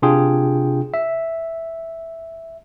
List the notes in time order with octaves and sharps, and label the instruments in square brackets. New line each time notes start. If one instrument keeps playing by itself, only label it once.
[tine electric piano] C3 D4 F4 G#4 G5
E5